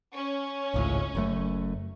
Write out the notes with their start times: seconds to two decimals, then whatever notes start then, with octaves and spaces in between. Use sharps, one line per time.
0.15 C#4
0.74 G#1 C#2 A2
1.15 F#1 F#2 A3